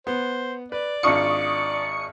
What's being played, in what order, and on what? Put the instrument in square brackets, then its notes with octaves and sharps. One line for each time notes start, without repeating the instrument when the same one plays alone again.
[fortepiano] B3 [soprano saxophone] C5
[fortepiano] B4 [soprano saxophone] D5
[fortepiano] G#1 D4 F4 [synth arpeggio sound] C#6 D#6 C#7